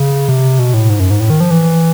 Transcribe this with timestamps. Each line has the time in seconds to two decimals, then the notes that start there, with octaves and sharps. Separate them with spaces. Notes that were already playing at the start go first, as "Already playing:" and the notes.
Already playing: C#3
0.28 C3
0.59 B2
0.74 A2
0.90 G#2
1.00 F#2
1.10 G#2
1.20 A2
1.30 D#3
1.40 F3
1.51 E3